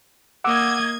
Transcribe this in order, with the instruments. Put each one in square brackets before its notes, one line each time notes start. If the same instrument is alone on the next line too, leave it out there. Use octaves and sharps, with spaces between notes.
[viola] A#3 D#5 [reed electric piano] F#5 D6 E6 [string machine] G#6